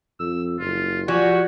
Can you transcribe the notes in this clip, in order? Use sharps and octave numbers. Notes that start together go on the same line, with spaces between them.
F2 E6
F#1 F4
F3 G3 F#4 G#5